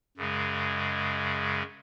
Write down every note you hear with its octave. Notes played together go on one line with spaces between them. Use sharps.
F#2 C#3 G#3